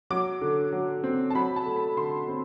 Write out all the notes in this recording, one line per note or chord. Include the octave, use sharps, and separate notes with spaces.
F#3 D6
D3
F#3
C4
A5
F#3 B5
A5
A3
B5
D3 C6
C4